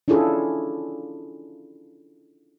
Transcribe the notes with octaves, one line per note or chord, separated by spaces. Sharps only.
C#4 D4 E4 F4 G#4 A4